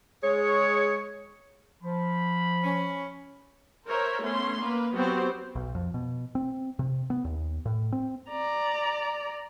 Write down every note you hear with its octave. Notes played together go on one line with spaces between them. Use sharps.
G#3 G#4 C#5
F3 B5
C#4
A#4 C5 C#5 E5
A3 B3 C#4 C6
A#3 B4
F#3 B3 C4 F#4 G4 C5
B1
F2
B2
C4
C3
B3
D#2
A2
C4
D5 A#5